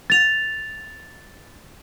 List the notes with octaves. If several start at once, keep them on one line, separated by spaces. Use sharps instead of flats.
A6 F7